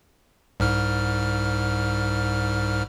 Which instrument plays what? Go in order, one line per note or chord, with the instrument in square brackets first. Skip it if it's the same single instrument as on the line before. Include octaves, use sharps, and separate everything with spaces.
[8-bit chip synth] C2 G#2 F6